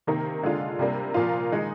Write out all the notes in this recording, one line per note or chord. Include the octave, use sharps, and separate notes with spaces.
C3 D#3 A#3
D3 G#3 D4 F4
C3 G3 A#3 D4
A#2 F3 A#3 F4
D#3 G#3 D#4